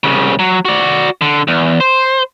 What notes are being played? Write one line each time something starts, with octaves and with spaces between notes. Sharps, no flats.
C2 C#3
F#3
F#4 D5
D3
E2
C5